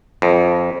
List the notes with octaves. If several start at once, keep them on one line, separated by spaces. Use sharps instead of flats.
F2